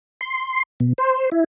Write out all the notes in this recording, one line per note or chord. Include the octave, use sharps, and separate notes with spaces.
C6
B2
C5
E4